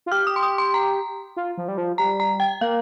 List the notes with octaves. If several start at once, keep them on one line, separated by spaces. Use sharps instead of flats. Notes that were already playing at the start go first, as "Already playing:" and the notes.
F4
G4 F6
D#6
C6
D#6
C6
A#5
F4
F3
G3
F3
G3 A#5
A#5
G5
A#3 F5